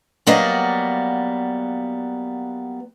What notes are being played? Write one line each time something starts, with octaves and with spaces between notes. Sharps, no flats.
F#3 G3 A#3 B3 D5 D#5